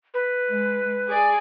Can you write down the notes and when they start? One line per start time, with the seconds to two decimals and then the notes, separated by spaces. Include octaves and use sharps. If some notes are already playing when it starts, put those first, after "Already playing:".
0.14 B4
0.49 G#3
1.07 G#4 D5 G#5